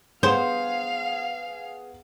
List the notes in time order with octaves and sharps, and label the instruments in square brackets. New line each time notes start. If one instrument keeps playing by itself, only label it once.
[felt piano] B3 G#4 F#5 [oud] C5 [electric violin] F5